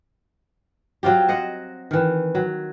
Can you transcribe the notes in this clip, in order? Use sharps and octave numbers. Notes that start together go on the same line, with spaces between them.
F#3 C4 F4 G4
C5 D#5 F#5
D#3 E3
F#3